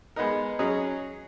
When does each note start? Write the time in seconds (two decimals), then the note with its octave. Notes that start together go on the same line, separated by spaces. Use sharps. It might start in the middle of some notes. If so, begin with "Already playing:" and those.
0.16 G#3 B3 D#4 A#4
0.59 F#3 C#4 G#4 D#5